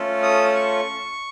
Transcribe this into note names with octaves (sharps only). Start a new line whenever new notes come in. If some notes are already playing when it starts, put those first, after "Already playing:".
Already playing: A3 C#4 F4 A4
D#6
C#6